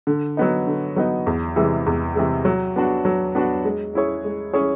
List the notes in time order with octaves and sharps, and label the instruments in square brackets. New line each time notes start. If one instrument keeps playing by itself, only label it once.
[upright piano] D3
F#3 B3 D#4
D3
F#3 B3 D#4
E2
C3 E3 G#3
E2
C3 E3 G#3
F#3
B3 D4 F#4
F#3
B3 D4 F#4
G#3
C#4 E4 G#4 C#5
G#3
C#4 E4 G#4 C#5